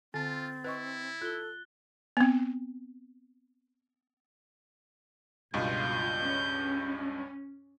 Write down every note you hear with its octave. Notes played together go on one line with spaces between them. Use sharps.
D3 C4 F4 A5 A6
E4 B4 D#5 C#6
F4 A4 F#6 G7
B3 C4
C#2 G2 B2 F4 D#5 G6
C#4